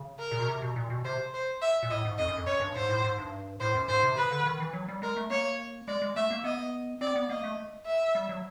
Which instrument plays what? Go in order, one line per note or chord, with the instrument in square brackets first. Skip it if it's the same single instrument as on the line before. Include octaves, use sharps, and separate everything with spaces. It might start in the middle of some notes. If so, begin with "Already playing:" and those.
Already playing: [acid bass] C#3
[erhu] A#4
[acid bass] A#2
B2
C3
B2
A#2
B2
[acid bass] C3 [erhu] C5
[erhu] C5
E5
[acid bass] A#2
[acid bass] A2 [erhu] D#5
[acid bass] G#2
[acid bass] F2 [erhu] D#5
[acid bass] F#2
F2
[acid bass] F#2 [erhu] C#5
[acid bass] G2
[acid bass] G#2 [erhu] C5
[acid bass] A2
G#2
G2
[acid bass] A2 [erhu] C5
[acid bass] F#2
[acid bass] G#2 [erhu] C5
[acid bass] C3
[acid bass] C#3 [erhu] B4
[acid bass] D3
D#3
E3
F#3
G3
[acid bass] G#3 [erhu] A#4
[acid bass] A3
[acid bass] A#3 [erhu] C#5
[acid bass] G#3 [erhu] D5
[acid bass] G#3
[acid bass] A3 [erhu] E5
[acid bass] A#3
[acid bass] B3 [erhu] D#5
[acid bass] C4 [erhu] D5
[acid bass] B3
[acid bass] A#3 [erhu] D#5
[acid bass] A3
[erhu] E5
[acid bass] G3
F#3